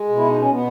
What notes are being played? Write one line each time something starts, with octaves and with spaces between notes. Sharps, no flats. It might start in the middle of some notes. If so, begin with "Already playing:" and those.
Already playing: G#3
B2
E4
D#4
C#4
B2 B3